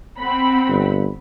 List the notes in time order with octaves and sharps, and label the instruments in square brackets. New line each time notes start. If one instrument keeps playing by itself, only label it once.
[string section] C4 F#5 B5
[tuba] G1